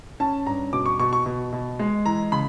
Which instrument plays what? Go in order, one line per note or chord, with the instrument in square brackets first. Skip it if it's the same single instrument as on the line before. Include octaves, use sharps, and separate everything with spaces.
[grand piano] C#4 A5
G2 A#5
B2 D6
C#6
B2 C#6
C#6
B2
B2
G#3
E3 A#5
C#3 B5